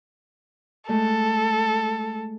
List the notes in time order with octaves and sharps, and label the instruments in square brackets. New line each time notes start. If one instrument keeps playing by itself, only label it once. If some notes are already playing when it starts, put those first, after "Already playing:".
[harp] G#3 A3 [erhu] A4